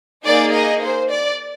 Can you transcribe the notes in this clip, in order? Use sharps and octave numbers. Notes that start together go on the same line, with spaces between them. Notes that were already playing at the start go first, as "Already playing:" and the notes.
A#3 D#4 G#4 D5
D#5
C5
D5